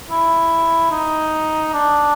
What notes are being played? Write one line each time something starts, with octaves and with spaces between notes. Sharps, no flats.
E4
D#4
D4